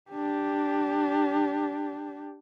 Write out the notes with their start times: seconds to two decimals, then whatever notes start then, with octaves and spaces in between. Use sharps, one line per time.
0.11 D4 G4